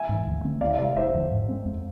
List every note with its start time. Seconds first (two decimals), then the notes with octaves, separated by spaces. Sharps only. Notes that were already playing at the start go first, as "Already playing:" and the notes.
Already playing: E5 G#5
0.09 G#2 E3
0.26 D2
0.44 D3 A3 C4
0.61 D2 D5 F5
0.71 E5
0.78 C3 G#3 D5 F5
0.96 F1 C5 E5
1.14 E2 D3 F3
1.32 G#2
1.49 G#3 C4
1.66 F2